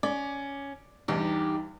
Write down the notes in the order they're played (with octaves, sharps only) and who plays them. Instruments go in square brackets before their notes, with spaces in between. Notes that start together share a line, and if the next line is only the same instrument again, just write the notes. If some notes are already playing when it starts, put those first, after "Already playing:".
[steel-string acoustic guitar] C#4 [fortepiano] D5
[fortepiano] E2 G2 [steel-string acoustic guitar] D#4 G4